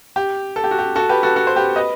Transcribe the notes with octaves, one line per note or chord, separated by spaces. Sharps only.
G4
A4
G4
F#4
G4
F#4 A4
G4 B4
F#4 A4
F#4 A4
C5
G4 B4
B4 D#5